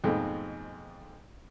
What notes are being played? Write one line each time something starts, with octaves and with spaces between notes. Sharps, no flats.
F2 G#2 B2 G#3 A3